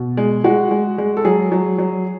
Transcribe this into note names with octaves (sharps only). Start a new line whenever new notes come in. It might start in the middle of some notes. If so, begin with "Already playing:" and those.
Already playing: B2
G#3
G#3 F#4
G#3
G#3
A4
F#3 G#4
F#3
F#3